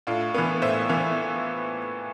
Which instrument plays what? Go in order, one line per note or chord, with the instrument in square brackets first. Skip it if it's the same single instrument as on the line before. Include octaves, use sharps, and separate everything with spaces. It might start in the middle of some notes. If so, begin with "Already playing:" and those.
[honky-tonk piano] A2 D4 F4
E3 B3
A2 C5 E5
E3 B3